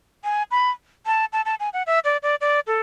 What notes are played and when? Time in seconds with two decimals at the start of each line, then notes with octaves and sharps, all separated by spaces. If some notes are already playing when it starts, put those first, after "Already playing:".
0.24 G#5
0.51 B5
1.06 A5
1.33 A5
1.45 A5
1.60 G#5
1.73 F#5
1.87 E5
2.05 D5
2.23 D5
2.41 D5
2.67 A4